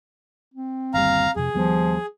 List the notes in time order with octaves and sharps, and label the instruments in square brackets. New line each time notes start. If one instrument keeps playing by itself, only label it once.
[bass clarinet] C4
[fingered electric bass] G1 D#2 G3 [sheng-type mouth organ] F5 A#5
[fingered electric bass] F2 C3 [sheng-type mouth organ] G#4
[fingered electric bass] D#2 G3 B3 [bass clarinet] F3